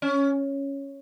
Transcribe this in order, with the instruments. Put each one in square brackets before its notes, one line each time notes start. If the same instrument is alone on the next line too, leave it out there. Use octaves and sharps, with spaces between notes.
[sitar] C#4